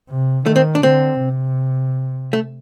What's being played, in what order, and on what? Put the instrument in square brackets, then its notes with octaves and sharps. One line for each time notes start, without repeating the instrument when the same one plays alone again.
[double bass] C3
[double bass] D#3 [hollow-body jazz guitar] A3
[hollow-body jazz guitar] C4
D4
[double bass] D3 [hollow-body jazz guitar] C4
[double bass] C3
[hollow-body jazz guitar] A3